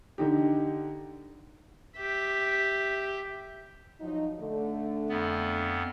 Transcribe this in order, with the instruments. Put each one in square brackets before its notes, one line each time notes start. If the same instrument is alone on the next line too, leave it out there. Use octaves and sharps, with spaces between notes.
[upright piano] D3 D#4 G4
[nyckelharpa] G4 E5
[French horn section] F3 F#3 D#4
D3 A3
[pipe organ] F2 B3